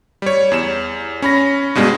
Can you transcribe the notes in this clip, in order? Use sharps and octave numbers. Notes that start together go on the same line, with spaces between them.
G3 C#5
E2 E7
C#4 B5 A#6
G2 B2 G3 G#3